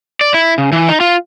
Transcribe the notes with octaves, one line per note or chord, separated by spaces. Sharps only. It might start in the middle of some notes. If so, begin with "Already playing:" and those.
D5
E4
C#3
E3
D#4
F4